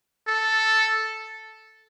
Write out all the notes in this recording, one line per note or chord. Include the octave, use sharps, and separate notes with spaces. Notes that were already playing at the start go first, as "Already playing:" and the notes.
A4